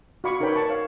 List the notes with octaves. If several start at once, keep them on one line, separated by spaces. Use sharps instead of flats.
F#4 D5 F5 B5 C#6 D6
D#4 A#4 B4 C#5 G5 B5
G5 A5 C#6
C#5 F5